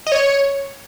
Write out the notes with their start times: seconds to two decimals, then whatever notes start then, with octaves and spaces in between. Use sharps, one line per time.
0.07 D#5
0.12 C#5